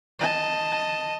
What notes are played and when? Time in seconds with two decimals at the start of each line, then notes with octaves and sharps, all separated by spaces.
0.19 D#5 A5